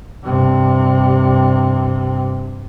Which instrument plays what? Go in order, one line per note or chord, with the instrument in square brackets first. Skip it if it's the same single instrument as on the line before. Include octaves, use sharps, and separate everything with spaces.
[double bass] G2 C3